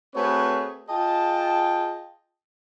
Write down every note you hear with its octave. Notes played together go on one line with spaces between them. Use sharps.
A3 C4 F#4 G#4 B4 C#5
F4 G#4 D#5 G5 A5